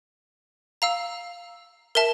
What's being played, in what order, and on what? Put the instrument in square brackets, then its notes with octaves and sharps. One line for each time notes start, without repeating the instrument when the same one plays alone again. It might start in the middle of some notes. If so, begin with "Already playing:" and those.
[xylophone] F5 A#5 E6
A#4 E5 A5